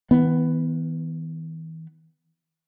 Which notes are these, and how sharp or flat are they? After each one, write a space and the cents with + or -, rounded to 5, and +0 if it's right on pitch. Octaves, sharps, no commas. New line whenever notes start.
E3 -40 B3 +10